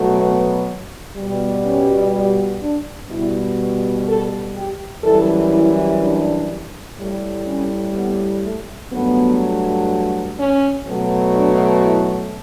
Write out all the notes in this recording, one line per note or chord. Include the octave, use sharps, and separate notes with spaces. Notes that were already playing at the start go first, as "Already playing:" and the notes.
Already playing: B2 F#3 A3
B3
B2 G3
C#4
D4
B2 G3 E4
A4
G4
F#2 E3 G3 A4
E4
D4
A2 G3
C#4
B3
A3
G2 F#3 A3 B3
C#4
B2 F#3 A3
D4
E4